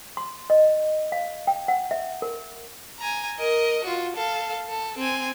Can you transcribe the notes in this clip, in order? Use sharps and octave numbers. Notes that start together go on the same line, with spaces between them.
C6
D#5
F5
G5
F#5
E5
A#4
G#5 A#5
A#4 D#5
F4 F#4
A4 F5
A4
C4 G#5